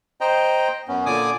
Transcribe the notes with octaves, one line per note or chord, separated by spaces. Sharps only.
C5 D#5 G5 A#5
F#2 B3 C#4
A#2 D3 D5 G#5 D6 D#6